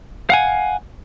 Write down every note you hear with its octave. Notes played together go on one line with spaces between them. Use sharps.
F5 F#5 G#5